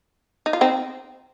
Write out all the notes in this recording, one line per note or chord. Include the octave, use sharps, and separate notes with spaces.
D#4
F4
C4 D#4